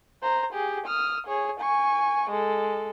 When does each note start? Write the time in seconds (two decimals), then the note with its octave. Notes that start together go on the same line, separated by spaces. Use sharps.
0.22 C5 A#5
0.53 G4 G#4
0.87 D#6 F6
1.27 G#4 C#5
1.60 G#5 C#6
2.30 G#3 A4